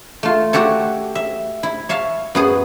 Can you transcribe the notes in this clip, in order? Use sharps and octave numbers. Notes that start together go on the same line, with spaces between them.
A3 F4
F#4 G4 A4 C#5
E5
E4
C#5 E5 F5 A5
F#2 B3 G#4